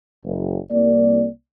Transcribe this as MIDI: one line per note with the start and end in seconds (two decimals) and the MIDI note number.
0.25 0.58 30
0.71 1.27 36
0.71 1.27 58
0.71 1.27 74